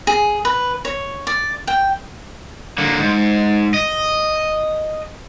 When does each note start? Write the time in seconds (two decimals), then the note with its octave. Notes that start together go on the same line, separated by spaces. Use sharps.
0.07 G#4
0.45 B4
0.85 C#5
1.27 D5
1.67 G5
2.78 D3 A#3
2.99 G#2
3.74 D#5